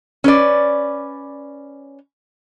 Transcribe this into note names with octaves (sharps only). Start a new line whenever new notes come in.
C#4 B4 D5